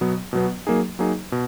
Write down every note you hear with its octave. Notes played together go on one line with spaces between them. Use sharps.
B2 F#3 B3
B2 F#3 B3
F#3 A#3 D#4 G#4
F#3 A#3 D#4 G#4
B2